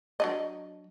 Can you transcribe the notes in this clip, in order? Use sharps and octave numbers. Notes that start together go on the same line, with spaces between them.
F#3 D4 D#5